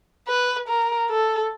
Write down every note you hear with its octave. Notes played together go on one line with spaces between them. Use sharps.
B4
A#4
A4